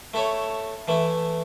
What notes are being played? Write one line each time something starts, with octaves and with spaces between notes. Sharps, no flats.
A3 E4 A4 C#5
E3 A3 E4